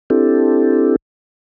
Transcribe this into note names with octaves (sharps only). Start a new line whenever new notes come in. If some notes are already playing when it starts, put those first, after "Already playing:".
C4 D4 E4 G4 A4